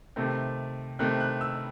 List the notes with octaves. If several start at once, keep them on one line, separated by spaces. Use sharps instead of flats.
C3 D#3 A3 C4 A5
C3 D#3 A3 C4 F#6
F#6
E6